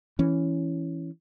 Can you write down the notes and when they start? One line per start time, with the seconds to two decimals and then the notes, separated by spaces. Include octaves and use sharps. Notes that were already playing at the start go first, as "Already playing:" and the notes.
0.19 E3 C#4